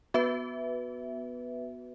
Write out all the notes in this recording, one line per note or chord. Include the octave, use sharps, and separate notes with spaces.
B3 F#4 B4 E5